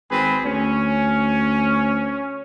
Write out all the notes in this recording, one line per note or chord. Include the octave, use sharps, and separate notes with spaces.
G#1 C4 G#4 B4
D2 C#4